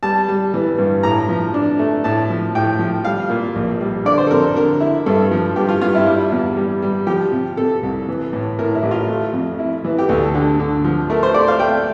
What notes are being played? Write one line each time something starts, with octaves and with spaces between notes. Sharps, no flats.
G3 A5
G3
E3
G2
A2 A#5
F3
D4
A3
A2 A5
F3
A2 G5
F3
G3 F5
A#2
A#1
G3
D3 D5
C5
A4
F2 A#4
D3 A#4
E4
G2 A4
F3
G2 G4
F4
G2 F4
E4
G3 E4
E2
G3
G3
F3 G4
C3
C3 A4
C2
E3
A2
A2 A#4
E4
A1
F4
A3
F2
E4
E3
G4
D2 A4
D3
D3
F3
A3 A#4
C5
A3 D5
F5
A3 G5